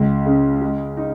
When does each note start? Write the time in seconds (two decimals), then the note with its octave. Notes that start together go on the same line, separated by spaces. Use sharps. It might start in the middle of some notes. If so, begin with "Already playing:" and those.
Already playing: C#2
0.25 C#3
0.62 G#3
0.97 D#4